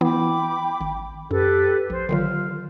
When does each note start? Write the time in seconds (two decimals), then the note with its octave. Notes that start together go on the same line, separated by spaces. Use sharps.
0.01 E3 B3 E4 G5 B5 D6
0.81 G#1
1.31 F#2 G4 A4 B4
1.90 A#1 C5
2.09 D3 D#3 F#3 F4